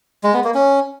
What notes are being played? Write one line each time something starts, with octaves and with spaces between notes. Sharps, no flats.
G#3
B3
A#3
C#4